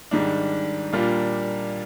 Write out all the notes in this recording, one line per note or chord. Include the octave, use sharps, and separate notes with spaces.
G#2 D#3 G3 D4
A#2 G3 A#3 D4 F4